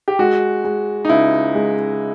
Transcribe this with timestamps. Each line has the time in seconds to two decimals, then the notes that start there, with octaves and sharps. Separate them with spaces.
0.08 G4
0.19 G#3 F#4
0.64 G#3
1.05 D#4
1.09 C#2 E4
1.55 G#3